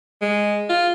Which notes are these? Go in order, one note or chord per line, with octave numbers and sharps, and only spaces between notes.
G#3
F4